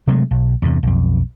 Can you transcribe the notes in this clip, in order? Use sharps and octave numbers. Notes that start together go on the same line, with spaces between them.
C3 F#3 G#3 A3
B1
E2 G2 C3
B1 F2